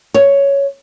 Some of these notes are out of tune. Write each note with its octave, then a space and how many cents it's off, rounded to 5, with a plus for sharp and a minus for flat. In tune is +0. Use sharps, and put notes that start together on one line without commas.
C#5 +5